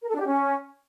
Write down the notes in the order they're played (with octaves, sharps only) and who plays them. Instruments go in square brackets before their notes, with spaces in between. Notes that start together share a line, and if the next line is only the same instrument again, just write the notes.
[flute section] A#4
A4
D4
G4
C#4